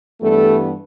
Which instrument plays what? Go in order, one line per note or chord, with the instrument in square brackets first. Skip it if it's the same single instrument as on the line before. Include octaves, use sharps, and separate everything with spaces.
[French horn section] G2 E3 G3 A3 B3 A4